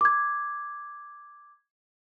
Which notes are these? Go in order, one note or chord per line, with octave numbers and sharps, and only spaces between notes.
D6 G#6